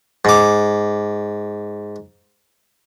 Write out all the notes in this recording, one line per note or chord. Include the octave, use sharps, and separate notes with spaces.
G#2 D6